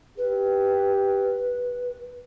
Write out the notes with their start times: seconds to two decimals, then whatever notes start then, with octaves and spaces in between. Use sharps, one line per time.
0.18 G4 B4